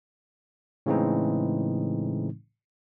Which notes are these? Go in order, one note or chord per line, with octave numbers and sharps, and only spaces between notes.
A2 C#3 E3 G#3 C4 D#4